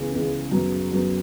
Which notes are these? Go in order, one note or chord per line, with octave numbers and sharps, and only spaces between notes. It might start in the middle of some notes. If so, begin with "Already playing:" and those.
Already playing: C#2 C#3 E3 B3 G#4
C#2 C#3 E3 B3 G#4
F#2 F#3 B3
F#2 F#3 B3